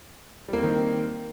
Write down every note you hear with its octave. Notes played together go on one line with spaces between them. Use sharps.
D#3 G3 A#3 C4